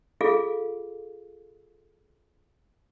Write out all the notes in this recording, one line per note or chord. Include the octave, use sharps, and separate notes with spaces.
F4 G#4 A4 F5